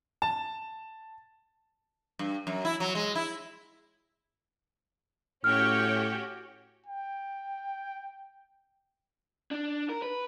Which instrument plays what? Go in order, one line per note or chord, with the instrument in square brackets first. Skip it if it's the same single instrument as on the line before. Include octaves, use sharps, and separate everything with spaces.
[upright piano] A5
[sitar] G2
F#2
E4
F#3
G#3
E4
[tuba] A2 [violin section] C#4 F#4 G4 [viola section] C#5 G5 [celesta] F6
[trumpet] G5
[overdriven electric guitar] D4
A#4
B4